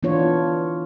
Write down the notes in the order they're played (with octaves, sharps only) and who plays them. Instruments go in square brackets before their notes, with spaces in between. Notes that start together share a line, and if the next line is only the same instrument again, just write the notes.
[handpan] E3 B3 D4 F4 C#5